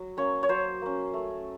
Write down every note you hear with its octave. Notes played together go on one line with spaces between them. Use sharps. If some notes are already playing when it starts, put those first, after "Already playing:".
Already playing: F#3
A#3 C#4 C#5
C#5
F#3 C5
A#3 C#4
A3